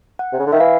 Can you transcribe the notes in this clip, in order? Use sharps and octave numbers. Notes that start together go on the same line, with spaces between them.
F#5
C3
C#3
D3
D#3 E5
E3 F5